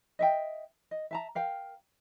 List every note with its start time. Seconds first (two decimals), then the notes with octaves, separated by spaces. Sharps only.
0.19 D#5 E5 G5
0.91 D#5
1.11 E5 A5 A#5
1.35 A#4 F5 G5